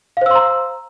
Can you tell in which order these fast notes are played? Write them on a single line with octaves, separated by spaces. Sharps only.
F5 C5 E6 C6 A#5